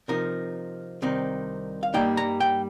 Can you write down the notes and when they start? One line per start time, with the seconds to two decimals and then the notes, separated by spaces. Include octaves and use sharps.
0.08 C3 F3 D#4 A#4
1.02 C2 C3 D#3 C4 D#4
1.83 F5
1.94 G2 G3 A#3 D#4 G5
2.17 A#5
2.40 G5